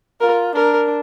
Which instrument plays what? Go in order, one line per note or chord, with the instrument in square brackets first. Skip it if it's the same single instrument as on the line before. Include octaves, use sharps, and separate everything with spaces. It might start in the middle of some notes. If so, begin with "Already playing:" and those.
[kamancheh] F4 [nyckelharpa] A#4
[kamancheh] D4 [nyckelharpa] A#4